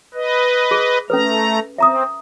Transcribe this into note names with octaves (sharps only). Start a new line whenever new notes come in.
B4 D#5
G#4
A3 C#4 A4 B4 A#5
C4 E5 A#5 D#6